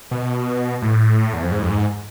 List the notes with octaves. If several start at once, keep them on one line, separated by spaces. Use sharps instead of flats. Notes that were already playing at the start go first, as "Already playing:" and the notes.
B2
A2
E2
F2
G#2
F2
G#2